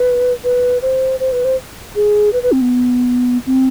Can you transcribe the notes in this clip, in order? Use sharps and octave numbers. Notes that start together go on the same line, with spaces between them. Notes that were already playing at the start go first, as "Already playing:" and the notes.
Already playing: B4
B4
C5
C5
B4
C5
G#4
B4
B4
C4
B3
C4